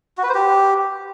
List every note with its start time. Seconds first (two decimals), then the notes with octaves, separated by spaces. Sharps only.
0.18 F#4
0.23 B4
0.29 C5
0.35 G4